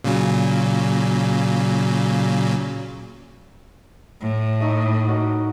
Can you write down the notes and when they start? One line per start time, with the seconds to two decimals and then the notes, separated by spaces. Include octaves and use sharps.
0.04 A#2 C#3 F#3
4.20 A2
4.60 A3 D#4 C#6
5.08 F#4 A#4 D#5